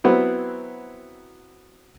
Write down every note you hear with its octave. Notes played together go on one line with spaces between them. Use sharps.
F#3 B3 C4 E4